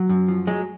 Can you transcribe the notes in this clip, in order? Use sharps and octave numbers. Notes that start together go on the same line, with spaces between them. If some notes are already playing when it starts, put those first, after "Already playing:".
Already playing: F#3
F#2
F3
F#3 G#3